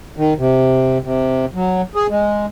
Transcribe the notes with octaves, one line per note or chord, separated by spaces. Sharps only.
D#3
C3
C3
F#3
G#4
G#3